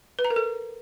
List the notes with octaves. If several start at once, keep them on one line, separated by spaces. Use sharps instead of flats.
B4
A#5
A#4
A4